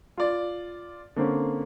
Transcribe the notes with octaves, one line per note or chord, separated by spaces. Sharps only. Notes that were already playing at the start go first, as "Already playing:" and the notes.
F4 D5
D3 A#3 C4 C#4